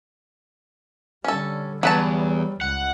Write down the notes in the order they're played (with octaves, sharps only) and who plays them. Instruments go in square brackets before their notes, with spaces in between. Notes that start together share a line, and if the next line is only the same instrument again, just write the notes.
[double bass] D3 G3 [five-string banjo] C#4 A4
[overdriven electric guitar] E2 [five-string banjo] F#3 B4 A5 [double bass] G3
[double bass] C#2 [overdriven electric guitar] F#5